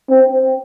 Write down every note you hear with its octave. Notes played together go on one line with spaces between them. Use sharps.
C4